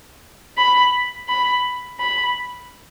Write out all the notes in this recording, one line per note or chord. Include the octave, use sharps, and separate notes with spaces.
B5
B5
B5